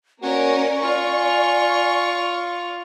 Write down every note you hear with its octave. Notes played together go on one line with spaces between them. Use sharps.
A#3 C#4 F#4 A#4 D5
F4 G#5 C#6